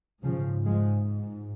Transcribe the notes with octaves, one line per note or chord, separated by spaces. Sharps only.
G#2 C#3 F3
F3 G#3